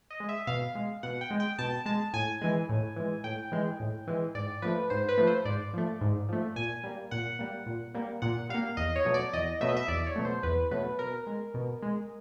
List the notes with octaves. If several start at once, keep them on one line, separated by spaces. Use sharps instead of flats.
D#5
G#3
E5
B2 F5
G#3
B2 F#5
G5
G#3
G5
B2 A5
G#3 A5
A2 G#5
E3 G#3
A2
E3 G#3
A2 G5
E3 G#3
A2
E3 G#3
G#2 D5
F3 A3 B4
G#2 C5
B4
F3 A3
C5
G#2 D5
F3 A3
G#2
F3 A3
A#2 G#5
G3 A#3
A#2 F#5
G3 A#3
A#2
G3 A#3
A#2 F#5
G3 A#3 F5
E2 D#5
C#5
B2 F#3 A3
D5
E2 D#5
B2 F#3 A3 E5
D#5
E5
E2 D5
C#5
B2 F#3 A3
C5
E2 B4
B2 F#3 A3 B4
B2 A#4
G#3
B2
G#3